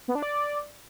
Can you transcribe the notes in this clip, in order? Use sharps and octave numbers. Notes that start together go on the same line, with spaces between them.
B3
D4
D5